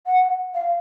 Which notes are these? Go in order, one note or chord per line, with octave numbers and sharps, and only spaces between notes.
F#5
F5